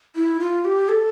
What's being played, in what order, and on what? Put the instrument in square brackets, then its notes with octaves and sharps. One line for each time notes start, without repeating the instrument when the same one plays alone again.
[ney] E4
F4
G4
A4